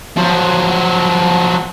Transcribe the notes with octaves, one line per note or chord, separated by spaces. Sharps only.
F3 F#3